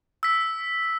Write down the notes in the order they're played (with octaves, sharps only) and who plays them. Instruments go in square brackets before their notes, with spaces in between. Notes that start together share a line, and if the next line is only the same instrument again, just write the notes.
[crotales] E6 B6